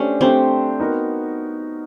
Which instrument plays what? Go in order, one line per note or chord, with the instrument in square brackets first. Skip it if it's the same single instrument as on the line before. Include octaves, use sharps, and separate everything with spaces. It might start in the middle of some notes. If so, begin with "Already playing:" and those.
Already playing: [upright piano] A3 D4 G4 C5 [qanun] C#4
[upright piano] A3 D4 G4 C5 [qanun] C4
[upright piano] B3 D#4 F#4 A#4